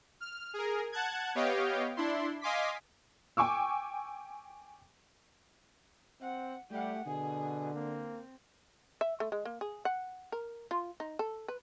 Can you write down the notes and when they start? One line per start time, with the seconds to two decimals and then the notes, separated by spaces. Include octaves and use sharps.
0.20 F6
0.54 G#4 A#4
0.92 F#5 A5 F#6 G#6
1.35 B3 G4 C#5 D#5 F5 G5
1.97 D4 E4 C6
2.41 D#5 F5 G#5 C6 D6 B6
3.37 G5 G#5 C#6 D6 E6
6.21 C4 F#5
6.71 G3 A3 G4 F#5
7.06 B2 D3 G#4
7.75 A#3 C4
9.01 E5
9.20 A3
9.32 G#3
9.45 A#3
9.61 G#4
9.85 F#5
10.32 A#4
10.71 F4
11.00 D#4
11.19 A4
11.48 B4